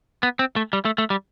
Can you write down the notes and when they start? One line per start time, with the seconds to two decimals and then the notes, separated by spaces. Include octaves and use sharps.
0.23 B3
0.39 C4
0.56 A3
0.73 G3
0.85 A3
0.98 A3
1.10 G3